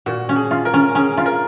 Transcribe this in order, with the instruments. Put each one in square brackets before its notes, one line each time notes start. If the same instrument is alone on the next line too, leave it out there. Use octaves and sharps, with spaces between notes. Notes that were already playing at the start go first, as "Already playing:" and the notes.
[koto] A#2 [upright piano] F#4
[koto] C#4
[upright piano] G#4
[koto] F4
[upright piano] A#4
[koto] C#4
[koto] C#4 [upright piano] G#4
[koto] F4
[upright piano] A#4